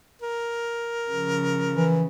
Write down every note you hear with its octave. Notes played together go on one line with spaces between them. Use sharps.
A#4
C#3 F3
E3